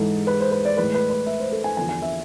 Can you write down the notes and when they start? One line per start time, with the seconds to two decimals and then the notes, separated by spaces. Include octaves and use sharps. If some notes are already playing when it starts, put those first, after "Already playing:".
Already playing: G#2 E3 G#3 A4
0.27 B4
0.40 C5
0.52 B4
0.65 D5
0.77 A2 E3 G#3 B4
0.95 B4
1.10 B4
1.27 E5
1.40 C5
1.52 A4
1.64 G#5
1.77 E2 D3 F3 G#5
1.89 G#5
2.02 E5